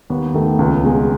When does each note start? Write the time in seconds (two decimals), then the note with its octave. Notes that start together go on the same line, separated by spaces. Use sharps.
0.10 D#2 B3
0.34 D#3 A3
0.59 C#2
0.84 B2 G#3